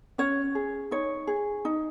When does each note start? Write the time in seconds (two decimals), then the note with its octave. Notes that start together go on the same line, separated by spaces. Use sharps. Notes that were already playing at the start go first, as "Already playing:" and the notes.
0.18 C#4 C#5
0.55 G#4
0.91 D#4 C#5
1.27 G#4
1.65 D#4